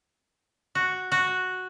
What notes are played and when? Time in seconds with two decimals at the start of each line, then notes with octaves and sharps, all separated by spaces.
0.75 F#4
1.12 F#4